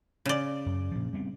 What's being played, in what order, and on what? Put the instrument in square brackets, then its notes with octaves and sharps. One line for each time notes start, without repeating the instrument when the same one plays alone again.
[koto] C#3 D5
[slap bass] F#2
A#2 F3
G3 B3 C4